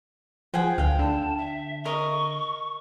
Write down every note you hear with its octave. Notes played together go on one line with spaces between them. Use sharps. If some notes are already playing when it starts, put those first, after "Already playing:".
F3 G#4 F#5 G5
D2 F5 G5
D3 A5
E5
A#4 D#5 C#6